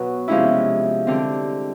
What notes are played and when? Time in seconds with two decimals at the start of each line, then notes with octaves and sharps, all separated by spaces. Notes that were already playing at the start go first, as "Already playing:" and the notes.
Already playing: B2 F#3 B3
0.28 C3 F3 G#3 C#4 E4
1.07 D3 G3 C4